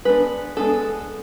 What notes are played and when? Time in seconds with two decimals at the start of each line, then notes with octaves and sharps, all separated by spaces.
0.05 G#3 B3 D4 B4
0.57 G#3 B3 D4 A4